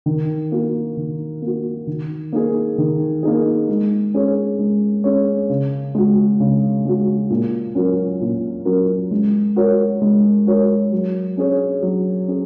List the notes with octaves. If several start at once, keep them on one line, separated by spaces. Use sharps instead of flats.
D#3
A#3 F#4
D#3
A#3 F#4
D#3
A#3 D#4 G#4
D#3
A#3 D#4 G#4
G#3
C#4 G#4 C#5
G#3
C#4 G#4 C#5
C#3
G#3 F#4
C#3
G#3 F#4
A#2
F#3 C#4 F#4 A#4
A#2
F#3 C#4 F#4 A#4
G#3
F#4 A#4 C#5
G#3
F#4 A#4 C#5
F#3
C#4 G#4 C#5
F#3
C#4 G#4